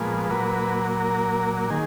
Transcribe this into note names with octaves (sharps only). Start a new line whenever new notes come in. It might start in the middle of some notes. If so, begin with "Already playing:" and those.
Already playing: A#2 F3 G#3 B3
A#2 F#3 A#3 B4
A#4
D#3 G#4